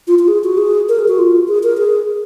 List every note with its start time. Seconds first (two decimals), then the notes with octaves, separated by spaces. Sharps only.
0.08 F4
0.19 F4
0.28 G#4
0.44 F#4
0.58 G#4
0.89 A#4
0.99 G#4
1.08 F#4
1.19 F4
1.48 G#4
1.63 A#4
1.78 G#4